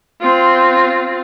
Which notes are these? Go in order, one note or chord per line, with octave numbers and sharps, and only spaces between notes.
C4 F4